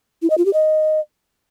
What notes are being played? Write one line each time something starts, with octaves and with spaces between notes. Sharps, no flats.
E4
D#5
F4
G4
D#5